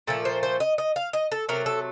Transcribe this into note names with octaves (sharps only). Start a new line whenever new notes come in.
A#2 F3 A3 A4
C5
C5
D#5
D#5
F5
D#5
A4
C3 F#3 A3 A#4
A4